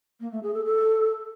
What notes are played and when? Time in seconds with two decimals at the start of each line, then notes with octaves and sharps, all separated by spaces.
0.20 A#3
0.32 A3
0.43 G#4
0.54 A4
0.65 A4